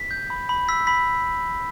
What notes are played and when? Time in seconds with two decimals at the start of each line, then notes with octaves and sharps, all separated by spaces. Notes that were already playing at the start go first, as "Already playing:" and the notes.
Already playing: B6
0.11 G6
0.30 B5
0.49 B5
0.69 E6 B6
0.87 B5 B6